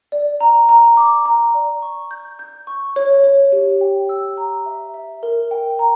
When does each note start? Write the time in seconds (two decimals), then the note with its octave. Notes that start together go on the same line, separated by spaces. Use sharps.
0.12 D5
0.41 A#5
0.69 A#5
0.97 D6
1.26 A#5
1.54 D5
1.82 C#6
2.11 G6
2.39 G6
2.67 C#6
2.96 C#5
3.24 C#5
3.52 G4
3.81 G5
4.09 E6
4.37 A#5
4.66 E5
4.94 E5
5.23 A#4
5.51 G5
5.79 A#5